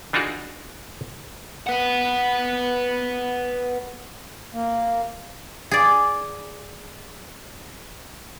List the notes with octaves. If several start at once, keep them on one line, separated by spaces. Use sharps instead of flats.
E3 D4 D#4 F4 F#4 G#4
B4 F#5
A#3
G#4 D5